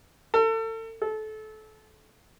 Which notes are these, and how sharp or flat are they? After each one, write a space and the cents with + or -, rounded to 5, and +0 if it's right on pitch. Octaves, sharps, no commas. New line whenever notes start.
A4 +35
A4 -25